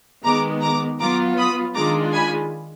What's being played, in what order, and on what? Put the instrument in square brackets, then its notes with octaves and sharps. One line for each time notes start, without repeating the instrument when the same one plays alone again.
[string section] D#3 G#3 B3 A#5 D6
A#5 D6
F#3 B3 F4 A#5 D6
B5 D#6
D#3 G#3 D4 F4 A#5 D6
G#5 B5